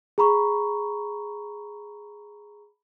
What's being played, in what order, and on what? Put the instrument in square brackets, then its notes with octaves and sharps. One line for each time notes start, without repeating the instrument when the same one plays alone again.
[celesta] G#4 A#5 B5 C#6